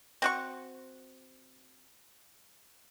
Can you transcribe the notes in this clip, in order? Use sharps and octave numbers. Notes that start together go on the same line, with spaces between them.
C4 F#4 C#6